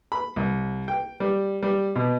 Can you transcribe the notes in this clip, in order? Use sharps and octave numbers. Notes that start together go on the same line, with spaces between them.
B5
C2
G5
G3
G3
B2